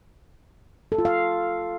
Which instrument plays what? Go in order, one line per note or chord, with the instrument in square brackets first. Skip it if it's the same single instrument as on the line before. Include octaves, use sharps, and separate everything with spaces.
[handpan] A4
F4
F5